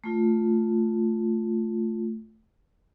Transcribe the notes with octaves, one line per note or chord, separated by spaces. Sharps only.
A3 F4